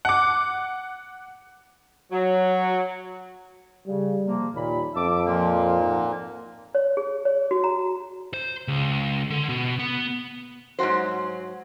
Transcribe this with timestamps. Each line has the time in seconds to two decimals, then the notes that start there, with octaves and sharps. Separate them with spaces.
0.05 F#5 D6
2.11 F#3
3.87 C#3 G3
4.24 C3 F3 A#3
4.54 D#2 A#2 B5
4.95 F2 E5 A5 D6
5.26 A#2 F3 A#3
5.80 G#2
6.75 C#5
6.97 G#4
7.25 C#5
7.51 F#4
7.64 A#5
8.34 C5
8.68 C#2
9.30 D3
9.49 B2
9.79 B3
10.79 G#2 F#3 D4 F#4 C5